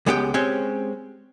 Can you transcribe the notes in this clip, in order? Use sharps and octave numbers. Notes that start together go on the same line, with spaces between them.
C#2 G#3 B3 G4 F5 G5
G#3 C4 C#4 G4 C#5